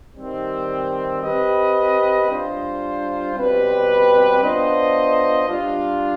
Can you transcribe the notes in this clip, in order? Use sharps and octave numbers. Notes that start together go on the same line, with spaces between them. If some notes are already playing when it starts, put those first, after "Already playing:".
D#3 G3 C4
C4 G4 B4 D#5
G3 D4 F4 C5
B2 G3 C4 G4 B4
B3 D4 F4 C5 D#5
G3 D4 F4